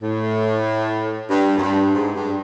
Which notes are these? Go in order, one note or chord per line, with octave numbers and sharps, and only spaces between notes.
A2
G2
F#2
G2
G#2
G2